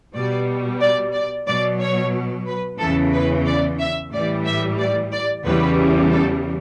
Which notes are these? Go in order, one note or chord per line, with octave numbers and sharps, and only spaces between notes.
B2 G3 D5
D5
D5
B2 F#3 D5
C#5
B4
E2 C#3 E3 A4
B4
D5
E5
A2 E3 G3 D5
E5
D5
D5
E2 C#3 E3 G3 B4
A4